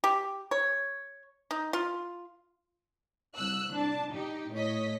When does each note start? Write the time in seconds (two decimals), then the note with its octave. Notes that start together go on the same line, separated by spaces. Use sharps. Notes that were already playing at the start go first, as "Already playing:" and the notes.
0.04 G4
0.51 C#5
1.51 D#4
1.73 F4
3.36 C2 E6 F#6
3.74 D4 A5
4.13 D#4 G4
4.53 A2 C#5 D#5 B6